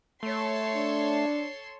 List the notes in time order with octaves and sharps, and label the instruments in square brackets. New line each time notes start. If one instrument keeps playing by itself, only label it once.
[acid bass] A3 [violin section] A4 C#5 C6
[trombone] D4